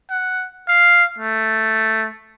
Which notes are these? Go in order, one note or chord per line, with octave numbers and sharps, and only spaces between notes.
F#5
F5
A3